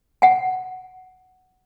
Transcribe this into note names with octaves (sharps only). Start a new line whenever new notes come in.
F#5 G#5